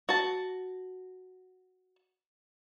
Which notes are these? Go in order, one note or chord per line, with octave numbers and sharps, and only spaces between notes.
F#4 A5